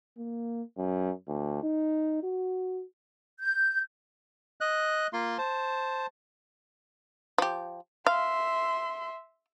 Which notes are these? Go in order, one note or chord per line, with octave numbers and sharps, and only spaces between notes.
A#3
F#2
D2
D#4
F#4
G6
D#5 F#6
A#3 F4 C6
C5 A5
F3 G4
E5 F5 C6